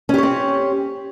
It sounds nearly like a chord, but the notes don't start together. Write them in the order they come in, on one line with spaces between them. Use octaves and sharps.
C#4 G4 C#5 C4